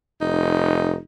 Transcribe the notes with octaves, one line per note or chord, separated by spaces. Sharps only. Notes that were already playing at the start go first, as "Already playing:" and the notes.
F1 D#4